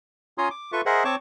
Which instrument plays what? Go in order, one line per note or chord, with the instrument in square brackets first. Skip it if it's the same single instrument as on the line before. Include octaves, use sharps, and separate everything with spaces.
[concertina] C#4 F4 C#5 A#5 C6 D#6
D6
F4 A4 B4 E5 C#6
G#4 A#4 C5 D#5 E5 F#5
C4 C#5 A5 C#6 D6